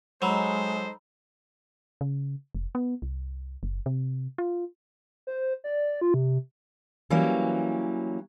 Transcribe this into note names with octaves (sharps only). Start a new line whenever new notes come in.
F#3 G#3 D#4 A4 C5 A#5 B5 E6
C#3
F1
B3
C2
F#1
C3
F4
C5
D5
F4
C3
E3 F#3 G3 A#3 C#4